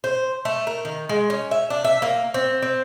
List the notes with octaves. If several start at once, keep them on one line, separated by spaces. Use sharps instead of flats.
C5
A3
A#4
D#3
G#3
C#4
E5
D4
E5
A#3
C4
C4